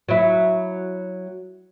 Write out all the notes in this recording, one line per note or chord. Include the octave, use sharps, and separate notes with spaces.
F#3 E4